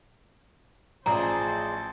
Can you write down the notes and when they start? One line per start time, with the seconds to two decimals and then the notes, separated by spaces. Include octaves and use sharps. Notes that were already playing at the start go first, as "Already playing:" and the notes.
1.06 A1 F3 G#4 C5 D5 A5 A#5